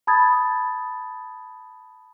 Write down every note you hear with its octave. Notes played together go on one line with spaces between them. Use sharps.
A5 B5 D#6 G#6 A6